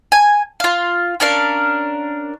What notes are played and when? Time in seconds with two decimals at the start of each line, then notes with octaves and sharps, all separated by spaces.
0.12 G#5
0.60 F4 F5
1.20 C#4 D4 A#4 F5